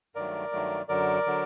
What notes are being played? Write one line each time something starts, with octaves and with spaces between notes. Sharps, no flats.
G2 D#3 F#3 A3 A#4 D5
G2 D#3 F#3 A3
F#2 D3 F#3 A#4 D5
D3 F#3